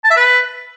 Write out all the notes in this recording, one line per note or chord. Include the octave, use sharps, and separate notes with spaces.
A5
E5
B4